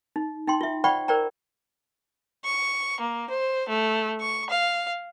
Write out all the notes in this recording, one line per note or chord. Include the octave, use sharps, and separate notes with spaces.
D#4
D#4 G5 C6
F4 E5
C5 D5 F#5 G5 B5 C#6
A#4 C5 D5 G5 A#5
C#6
A#3
C5
A3
C#6
F5